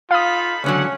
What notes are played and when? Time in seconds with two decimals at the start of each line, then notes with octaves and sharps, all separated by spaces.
0.11 D#4 F4 A4 F5 B5 D#6
0.64 C#2 D3 F#3 C#4 F#5